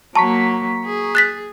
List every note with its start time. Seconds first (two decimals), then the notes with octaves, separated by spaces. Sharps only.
0.15 F#3 A#3 A5 A#5 C#6 B6
0.85 G#4
1.15 F#6 A6 B6